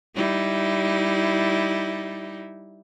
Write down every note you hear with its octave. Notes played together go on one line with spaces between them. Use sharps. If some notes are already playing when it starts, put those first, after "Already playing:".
G3 D#4 E4